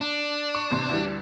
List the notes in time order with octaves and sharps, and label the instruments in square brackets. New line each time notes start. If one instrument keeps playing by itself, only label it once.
[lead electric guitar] D4
[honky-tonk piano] C#6
A1 C3 C6
D2 E3 G3